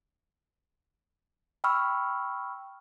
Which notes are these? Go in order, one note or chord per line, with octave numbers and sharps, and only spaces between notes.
G5 B5 C#6 E6 F6